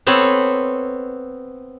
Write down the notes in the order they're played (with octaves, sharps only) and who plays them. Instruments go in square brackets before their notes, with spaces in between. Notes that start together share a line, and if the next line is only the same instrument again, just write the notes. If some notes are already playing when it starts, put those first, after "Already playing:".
[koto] B3 C4 A4 B4 C#5